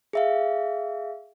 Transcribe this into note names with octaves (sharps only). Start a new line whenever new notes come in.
G#4 E5 F5